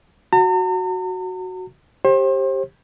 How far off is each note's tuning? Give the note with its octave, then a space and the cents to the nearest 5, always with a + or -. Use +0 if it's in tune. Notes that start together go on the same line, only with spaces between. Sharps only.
F#4 +0 A#5 -45
G4 +0 C5 +35